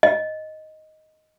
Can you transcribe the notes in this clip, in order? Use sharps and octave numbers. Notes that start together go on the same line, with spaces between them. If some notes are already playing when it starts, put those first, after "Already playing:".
D#5